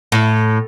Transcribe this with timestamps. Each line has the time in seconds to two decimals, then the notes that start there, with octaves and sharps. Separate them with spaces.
0.12 A2